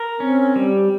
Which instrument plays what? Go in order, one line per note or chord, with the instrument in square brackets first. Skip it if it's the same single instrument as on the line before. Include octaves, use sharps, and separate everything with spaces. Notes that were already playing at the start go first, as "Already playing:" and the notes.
Already playing: [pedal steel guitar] A#4
[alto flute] C4 [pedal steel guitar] C#4
[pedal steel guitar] G3